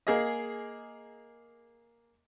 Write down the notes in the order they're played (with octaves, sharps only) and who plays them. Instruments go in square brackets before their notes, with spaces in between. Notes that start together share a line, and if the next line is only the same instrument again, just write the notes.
[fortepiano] A#3 G#4 D#5